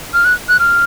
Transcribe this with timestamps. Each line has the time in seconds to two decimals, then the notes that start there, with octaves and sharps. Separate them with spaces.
0.14 F6
0.25 F#6
0.49 F#6
0.59 F6